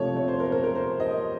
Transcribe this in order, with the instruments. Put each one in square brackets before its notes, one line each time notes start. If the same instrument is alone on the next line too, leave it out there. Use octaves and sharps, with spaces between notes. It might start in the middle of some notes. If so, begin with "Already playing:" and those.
Already playing: [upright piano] C3 F3 A3 C#5
C#5
C5
A#4
A#4
A#4
C5
D#5